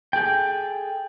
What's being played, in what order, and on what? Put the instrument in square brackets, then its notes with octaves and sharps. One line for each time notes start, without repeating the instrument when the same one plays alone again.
[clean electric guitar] G#4 A4 G5